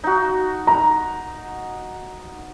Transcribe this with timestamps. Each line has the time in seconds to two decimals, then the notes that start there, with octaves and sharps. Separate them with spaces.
0.04 D#4 F#4
0.67 A#5